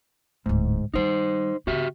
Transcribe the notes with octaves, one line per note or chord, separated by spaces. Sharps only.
D1 G#2 A3
D#3 G3 D#4 C5
C#3 B3 F#4 G4 E5